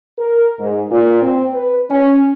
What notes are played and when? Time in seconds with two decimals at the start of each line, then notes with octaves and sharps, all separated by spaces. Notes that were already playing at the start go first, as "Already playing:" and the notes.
0.18 A#4
0.60 G#2
0.91 A#2
1.22 C4
1.53 B4
1.91 C#4